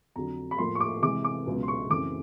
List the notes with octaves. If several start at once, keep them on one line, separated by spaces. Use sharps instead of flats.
F2 D3 F#3 A#5
B5
A2 F3 A#3 C6
C#6
D6
C3 E3 G#3 D6
D6
C#2 B2 F#3
C6
C#6
F#2 C#3 E3 A3 C4 D6